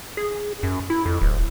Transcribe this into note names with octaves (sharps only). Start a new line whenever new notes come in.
G#4
F#2
E4
F2
D1